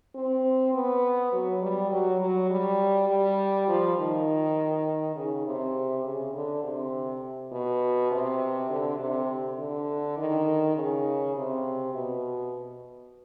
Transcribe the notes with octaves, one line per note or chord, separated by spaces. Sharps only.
C4
B3
F#3
G3
F#3
F#3
G3
G3
F3
D#3
C#3
C3
C#3
D3
C3
B2
C3
D3
C3
D3
D#3
C#3
C3
B2